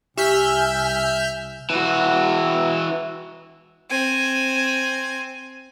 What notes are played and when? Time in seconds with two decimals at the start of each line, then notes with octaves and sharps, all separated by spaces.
0.18 C2 G4 E5 G#5 F6 G6
1.70 E3 F#4
3.90 C4 G#5